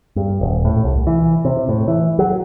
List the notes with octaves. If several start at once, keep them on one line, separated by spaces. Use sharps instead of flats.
G2
D#1
A2
C2
E3
C3
A2
E3
F#3